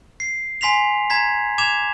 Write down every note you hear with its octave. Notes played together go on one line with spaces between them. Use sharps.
C7
G#5 C6 B6 C7 F7
A#5 G#6 B6
D6 G#6 E7 F7